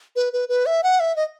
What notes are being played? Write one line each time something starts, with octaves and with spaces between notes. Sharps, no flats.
B4
B4
B4
E5
F#5
E5
D#5